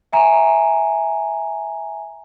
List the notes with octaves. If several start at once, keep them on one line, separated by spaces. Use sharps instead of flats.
E5 G#5 A#5